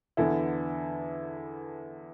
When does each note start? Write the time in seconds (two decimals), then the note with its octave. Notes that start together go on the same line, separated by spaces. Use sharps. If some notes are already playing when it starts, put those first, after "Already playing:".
0.17 E2 D3 B3 E4 A4